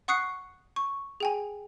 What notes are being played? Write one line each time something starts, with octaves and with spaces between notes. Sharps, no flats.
F#5 C#6 D#6 F#6 C7 C#7
C#6
G#4 G5 G#5